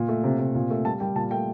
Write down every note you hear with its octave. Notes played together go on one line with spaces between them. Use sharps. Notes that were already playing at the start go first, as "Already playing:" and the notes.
Already playing: A#2
A3
C3
C3
A#2
A3
G3 A5
G3 G5
A#2 A5
A3 G5